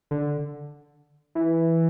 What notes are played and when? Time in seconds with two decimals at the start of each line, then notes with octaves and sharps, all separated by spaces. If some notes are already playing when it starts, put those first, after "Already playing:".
0.11 D3
1.35 E3